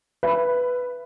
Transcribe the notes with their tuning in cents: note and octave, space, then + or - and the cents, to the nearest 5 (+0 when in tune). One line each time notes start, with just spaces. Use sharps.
B4 +0 E5 +30 B5 +15